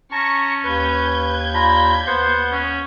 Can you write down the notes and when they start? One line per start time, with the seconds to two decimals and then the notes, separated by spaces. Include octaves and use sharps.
0.12 C#4 A5 A#5 C#6
0.64 D#2 B4 G6 G#6
1.54 D4 F4 A#5 B5
2.07 D#2 B3 C5 F#5
2.52 C#4